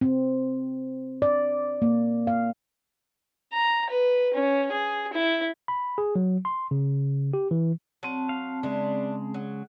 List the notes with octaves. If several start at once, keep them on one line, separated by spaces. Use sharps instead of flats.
C4
D5
A#3
F5
A#5
B4
C#4
G#4
E4
B5
G#4
F#3
C6
C#3
G4
E3
F#3 C4 A5
F5
C#3 G#3 D4 E4
F#3